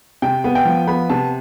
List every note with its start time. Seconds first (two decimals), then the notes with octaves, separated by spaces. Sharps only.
0.22 C3 G5
0.44 B3
0.55 G5
0.65 F3
0.87 B3 B5
1.09 C3 A5